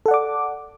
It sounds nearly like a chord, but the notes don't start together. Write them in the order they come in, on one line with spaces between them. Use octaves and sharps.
A4 F#5 D5 D6